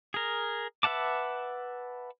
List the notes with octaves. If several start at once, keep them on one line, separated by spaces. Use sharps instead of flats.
G#4 A#4
B4 E5 F#5 A5 D6